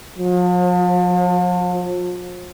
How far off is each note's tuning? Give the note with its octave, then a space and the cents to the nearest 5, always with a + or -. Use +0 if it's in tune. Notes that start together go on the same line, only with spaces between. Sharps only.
F3 +40